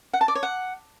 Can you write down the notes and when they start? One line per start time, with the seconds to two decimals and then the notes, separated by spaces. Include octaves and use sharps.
0.13 F#5
0.21 A5
0.28 D5
0.35 C#5
0.43 F#5